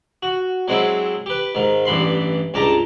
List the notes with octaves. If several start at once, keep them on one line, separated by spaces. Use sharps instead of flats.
F#4
F#3 G#3 C4 E4
G4 B4
G#2 D#3
A1 G2 E3 B5 C6
C#2 G2 G4 A5 A#5